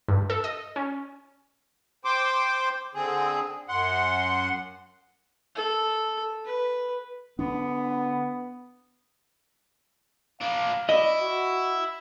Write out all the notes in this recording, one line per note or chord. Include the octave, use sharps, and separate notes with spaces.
G2
A4
D#5
C#4
C5 G5 C6 D6
D3 C4 G#4
F#2 F#5 C6
A4
B4
D3 B3 D4
A#3 D4 F5
E4 D5 D#5
F#4